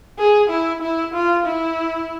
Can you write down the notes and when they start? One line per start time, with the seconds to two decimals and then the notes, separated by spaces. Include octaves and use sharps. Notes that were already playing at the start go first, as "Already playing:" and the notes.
0.19 G#4
0.50 E4
0.82 E4
1.14 F4
1.46 E4